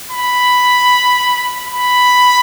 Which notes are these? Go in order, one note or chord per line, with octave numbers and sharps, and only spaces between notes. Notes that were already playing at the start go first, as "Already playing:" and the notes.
B5
B5